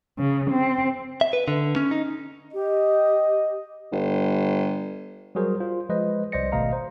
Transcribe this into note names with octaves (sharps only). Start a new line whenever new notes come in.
C#3
C4
E5
B4
D3
C#4
D#4
G4 D#5
G1
F#3 G3 F#4 G#4 A#4 C5
F4 C5
F3 G#3 B4 C5 D#5
C2 C5 D5 D#5 A#6 C#7
G#1 B2 A3 D#5 F5 A#5
C5